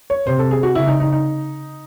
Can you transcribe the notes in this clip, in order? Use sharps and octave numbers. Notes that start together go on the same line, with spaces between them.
C#5
C3 C5
A4
G#4
F#4
C#3 E4
D#4
D#4
D#4